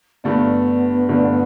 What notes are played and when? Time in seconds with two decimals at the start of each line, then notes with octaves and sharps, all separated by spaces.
0.24 G2 D3 A3 B3 D4
1.09 G2 D3 A3 D4